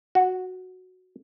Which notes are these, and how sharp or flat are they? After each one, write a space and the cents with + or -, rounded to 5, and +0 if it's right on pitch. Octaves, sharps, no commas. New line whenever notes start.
F#4 -5